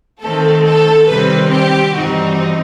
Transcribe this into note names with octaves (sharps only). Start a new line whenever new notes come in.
D#3 A3 C4 A4
A4
C3 D#3 G3 C4 B4
G4
G2 E3 G3 C4 D#4 F#4